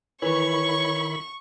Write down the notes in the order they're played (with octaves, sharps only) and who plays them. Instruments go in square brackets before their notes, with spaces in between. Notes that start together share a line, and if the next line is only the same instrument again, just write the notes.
[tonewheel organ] D#3 E4 B5 [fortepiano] E3 [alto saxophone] C#5 [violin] C#6